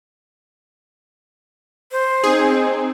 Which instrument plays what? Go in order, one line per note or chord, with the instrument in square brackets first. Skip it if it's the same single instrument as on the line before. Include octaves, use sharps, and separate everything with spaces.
[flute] C5
[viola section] C4 D#4 [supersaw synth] G#4